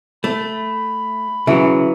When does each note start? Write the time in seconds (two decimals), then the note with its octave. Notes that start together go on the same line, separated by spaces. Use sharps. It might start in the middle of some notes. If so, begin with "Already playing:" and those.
0.24 A3 B5
1.47 C#3 E3 F#3